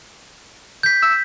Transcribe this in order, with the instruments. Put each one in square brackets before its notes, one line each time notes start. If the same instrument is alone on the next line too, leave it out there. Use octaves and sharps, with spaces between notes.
[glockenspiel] G6 B6
[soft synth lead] E6